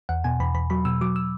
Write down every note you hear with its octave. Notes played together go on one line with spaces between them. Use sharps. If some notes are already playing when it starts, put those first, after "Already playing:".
E2 F#5
B2 G#5
E2 B5
E2 B5
F#3 B5
B2 E6
F#3 D6
E6